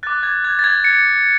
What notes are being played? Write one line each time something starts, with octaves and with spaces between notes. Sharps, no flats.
D6 F#6 A6
G#6
G#6
A6
G#6
C#7